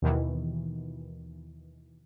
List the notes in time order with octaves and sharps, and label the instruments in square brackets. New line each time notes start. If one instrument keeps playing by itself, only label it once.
[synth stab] D#2 B2 D#3 E3